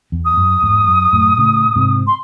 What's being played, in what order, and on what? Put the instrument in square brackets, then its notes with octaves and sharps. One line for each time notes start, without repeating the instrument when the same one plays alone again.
[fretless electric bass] E2
[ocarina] D#6
[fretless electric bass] F#2
E2 G#2
F#2
F#2 A2
A2 C#3
G#2 C3
[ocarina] C6